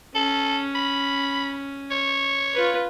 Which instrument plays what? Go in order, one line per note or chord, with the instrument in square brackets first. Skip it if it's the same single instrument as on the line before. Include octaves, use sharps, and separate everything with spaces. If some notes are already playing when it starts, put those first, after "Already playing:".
[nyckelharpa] C#4 [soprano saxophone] A4
[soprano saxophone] B5
C#5
[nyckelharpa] F4 B4